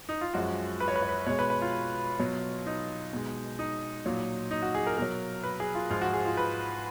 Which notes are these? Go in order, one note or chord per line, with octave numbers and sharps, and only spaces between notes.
D#4
F4
F#2 F3 G#3 F#4
B4
C#5
B4
C#5
B4
B2 G#3 C#5
B4
B4
F4
B2 F#3
D#4
B2 G#3
D#4
A#2 F#3
D#4
F#4
G#4
A#4
B2 F#3 A#4
B4
G#4
F4
G#2 F3 G#3 F4
F#4
G#4
F4
B4